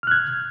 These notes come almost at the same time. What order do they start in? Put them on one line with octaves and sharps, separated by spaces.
F6 F#6 G#6